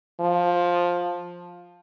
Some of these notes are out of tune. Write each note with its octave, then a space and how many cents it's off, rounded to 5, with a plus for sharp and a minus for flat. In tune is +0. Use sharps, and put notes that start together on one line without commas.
F3 +10